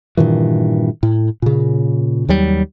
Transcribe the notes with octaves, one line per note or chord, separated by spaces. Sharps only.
G2 A#2 D#3 E3
A2
A#2 C#3
D#2 F#3 G3